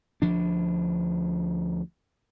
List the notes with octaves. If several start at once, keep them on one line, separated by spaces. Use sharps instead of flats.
D2 F3 D4